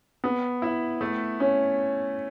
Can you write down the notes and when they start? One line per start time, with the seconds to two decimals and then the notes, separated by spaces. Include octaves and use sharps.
0.24 B3
0.62 E4
1.01 A3
1.40 C#4